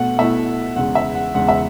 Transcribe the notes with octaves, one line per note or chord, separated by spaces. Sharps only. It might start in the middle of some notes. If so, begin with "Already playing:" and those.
Already playing: B2 A3 F#5
B2 A3 E4 E5
E2 C#3 G#3 F#5
E5
F#5
E2 C#3 G#3 F#5
E5